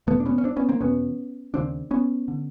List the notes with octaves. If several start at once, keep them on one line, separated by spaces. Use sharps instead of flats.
E2 B2 A3 B3
D4
B3 C#4
C#4
C4 D4
B3 C#4
A#3 C4
E2 B2 B3 C#4
D#2 C#3 C4 D4
B3 C#4
D3